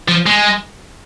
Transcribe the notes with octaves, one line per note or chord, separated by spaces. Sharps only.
F3
G#3